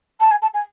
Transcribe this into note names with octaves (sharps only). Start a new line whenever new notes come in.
A5
G#5
A5
G#5